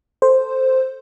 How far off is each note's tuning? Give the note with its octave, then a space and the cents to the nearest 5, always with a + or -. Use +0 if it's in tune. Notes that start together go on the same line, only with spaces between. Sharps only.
A4 +5 C5 +0